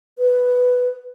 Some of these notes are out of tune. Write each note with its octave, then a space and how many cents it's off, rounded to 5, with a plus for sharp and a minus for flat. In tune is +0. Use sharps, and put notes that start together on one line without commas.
B4 +5